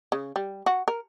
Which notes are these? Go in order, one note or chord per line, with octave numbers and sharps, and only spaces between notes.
C#3
G3
F#4
A#4